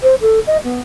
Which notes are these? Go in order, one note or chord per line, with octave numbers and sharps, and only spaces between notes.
C5
A4
D#5
B3